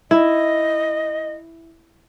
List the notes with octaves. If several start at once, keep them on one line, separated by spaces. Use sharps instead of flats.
E4 D#5